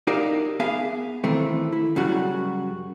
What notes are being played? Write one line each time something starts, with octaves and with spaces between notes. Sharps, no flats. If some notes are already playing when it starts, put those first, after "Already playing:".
D#4 G4 A#4 D5 E5 F5
B3 G#4 E5 F5
D#3 E3 A3 C4
E4
F#2 C#3 G3 F#4